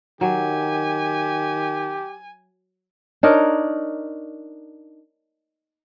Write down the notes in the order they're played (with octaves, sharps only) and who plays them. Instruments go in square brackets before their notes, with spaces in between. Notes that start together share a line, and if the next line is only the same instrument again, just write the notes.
[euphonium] D#3 [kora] F#3 [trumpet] G4 [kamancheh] G#5
[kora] D4 D#4 A#4 C#5